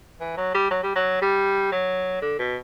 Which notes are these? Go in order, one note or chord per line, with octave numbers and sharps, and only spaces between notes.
E3
F#3
G3
F#3
G3
F#3
G3
F#3
D3
B2